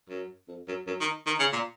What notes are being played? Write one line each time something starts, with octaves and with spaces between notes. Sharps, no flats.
F#2
F2
F#2
F#2
D#3
D#3
C#3
A#2